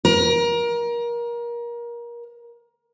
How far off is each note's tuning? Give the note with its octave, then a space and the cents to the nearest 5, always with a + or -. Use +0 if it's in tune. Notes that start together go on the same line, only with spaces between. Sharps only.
A#4 +25